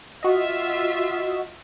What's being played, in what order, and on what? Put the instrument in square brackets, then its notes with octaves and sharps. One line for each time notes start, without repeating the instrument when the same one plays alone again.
[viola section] F4 E5 [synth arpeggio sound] F#4 D#5